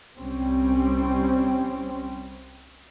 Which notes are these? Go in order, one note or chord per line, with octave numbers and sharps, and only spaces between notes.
C2 G3 C4 C#4